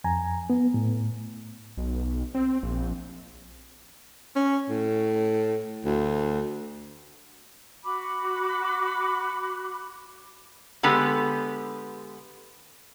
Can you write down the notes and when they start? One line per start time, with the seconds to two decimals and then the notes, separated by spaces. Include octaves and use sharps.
0.04 F2 G#5 A#5
0.50 B3
0.74 A2
1.77 B1
2.35 C4
2.63 A#1
4.36 C#4
4.69 A2
5.85 D2
7.84 F#4 B5 D6
10.83 D3 G#3 B3 G4